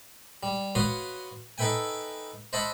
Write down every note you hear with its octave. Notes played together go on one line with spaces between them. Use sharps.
G3
F#4 B4 C#5 F5 C6 D#6
D#4 A4 B4 E5 G5 G#5
C5 D#5 E5 F#5 A5 B5